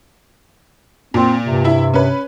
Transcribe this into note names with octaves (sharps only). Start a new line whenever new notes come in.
A#2 C4
G2 C3
E4 E5
C#4 B4